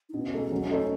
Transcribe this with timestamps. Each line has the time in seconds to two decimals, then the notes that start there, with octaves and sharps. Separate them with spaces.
0.09 D#4
0.14 B2 C#4
0.33 G#3 D#4 A4
0.52 F#3
0.71 A3 D#4 A4 C#5